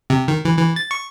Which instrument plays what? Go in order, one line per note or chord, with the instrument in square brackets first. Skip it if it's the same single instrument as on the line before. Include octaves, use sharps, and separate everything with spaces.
[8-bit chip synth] C3
D#3
E3
E3
A6
C#6